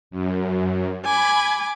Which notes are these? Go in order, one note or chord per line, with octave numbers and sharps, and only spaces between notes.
F#2
G#5 B5 D6 G#6